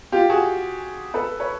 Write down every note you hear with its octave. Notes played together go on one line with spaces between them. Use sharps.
F4 G4
F#4 G#4
A4 B4
B4 C#5